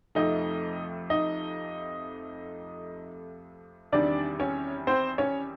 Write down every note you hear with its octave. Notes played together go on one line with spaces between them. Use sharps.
F2 C3 F3 A3 D#4 D#5
D#4 D#5
E2 C3 D#3 G3 D4 D5
C#4 C#5
C4 C5
C#4 C#5